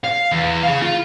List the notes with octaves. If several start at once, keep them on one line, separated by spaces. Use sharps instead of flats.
F5
E2
G#4 F5
F4